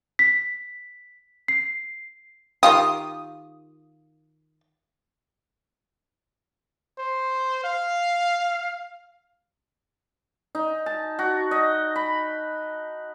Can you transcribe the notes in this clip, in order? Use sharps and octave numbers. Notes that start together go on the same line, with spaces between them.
B6
C7
D#3 F4 G4 D#6
C5
F5
D#4
A5
F#4
D#5
B5